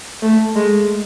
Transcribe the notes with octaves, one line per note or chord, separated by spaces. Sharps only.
A3
G#3